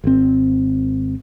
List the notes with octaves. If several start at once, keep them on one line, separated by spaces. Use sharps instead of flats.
G#1 C4